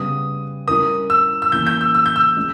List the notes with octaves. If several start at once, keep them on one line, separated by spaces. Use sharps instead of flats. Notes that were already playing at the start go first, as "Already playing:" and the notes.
Already playing: C#3 G3 B3 D#6
G3 C#4 E4 A#4 D#6
E6
E6
E3 A#3 C#4 G6
G6
E6
E6
G6
E6
G#3 C#4